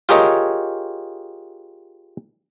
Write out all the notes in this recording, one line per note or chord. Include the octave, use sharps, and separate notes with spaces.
F4 G4 G#4 A#4 C#5 D#5